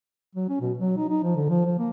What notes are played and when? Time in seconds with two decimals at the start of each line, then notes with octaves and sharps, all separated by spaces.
0.35 F#3
0.49 C#4
0.61 B2
0.78 F#3
0.97 D#4
1.09 D#4
1.23 F3
1.36 D3
1.49 F3
1.66 F3
1.78 A#3